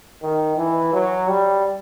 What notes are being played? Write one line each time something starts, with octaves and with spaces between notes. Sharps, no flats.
D#3
E3
F#3
G3